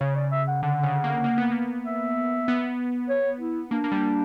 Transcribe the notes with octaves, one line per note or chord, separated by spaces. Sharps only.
C#3 C#5
D5
E5
F#5
D3 F#5
C#3
A#3
A#3
B3
A#3
E5
B3
C#5
E4
A#3 D4
A#3
G3